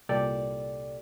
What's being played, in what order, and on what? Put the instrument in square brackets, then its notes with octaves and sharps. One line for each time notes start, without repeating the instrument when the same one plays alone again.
[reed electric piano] C2 A#2 G4 A4 D5